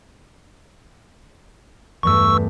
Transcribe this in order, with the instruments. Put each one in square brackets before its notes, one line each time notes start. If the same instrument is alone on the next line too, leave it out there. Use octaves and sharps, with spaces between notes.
[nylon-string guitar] E2 G2 A3 [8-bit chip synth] C#6 E6